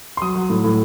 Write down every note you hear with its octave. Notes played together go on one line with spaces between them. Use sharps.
C6
F#3 D#6
F#3
A2
A2